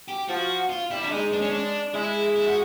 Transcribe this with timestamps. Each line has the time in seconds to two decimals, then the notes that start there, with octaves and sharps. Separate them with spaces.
0.08 G4
0.28 F3 F#4
0.70 F4
0.90 G3 E4
1.01 D4
1.11 G#3 D#4
1.32 D4
1.41 C#4
1.50 D4
1.94 G#3 E4
2.36 E4
2.47 F#4